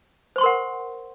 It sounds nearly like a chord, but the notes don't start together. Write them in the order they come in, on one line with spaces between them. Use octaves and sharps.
C5 C#6 C6 A#4 F#5